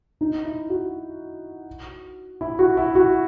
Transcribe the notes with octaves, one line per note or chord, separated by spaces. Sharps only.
D#4
E4
F#4
E4
F#4
E4
F#4